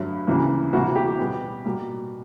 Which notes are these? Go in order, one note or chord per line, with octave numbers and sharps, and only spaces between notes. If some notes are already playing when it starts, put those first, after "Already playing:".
Already playing: G2 D3 F#3 A3
D2 C#3 E3 G3 A#3
D2 C3 E3 G3 A#3 F#4
G4
B2 G3 B3
B2 G3 A#3